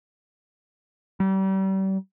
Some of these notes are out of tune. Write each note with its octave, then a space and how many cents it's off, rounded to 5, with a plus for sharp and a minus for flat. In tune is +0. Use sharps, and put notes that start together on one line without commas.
G3 -35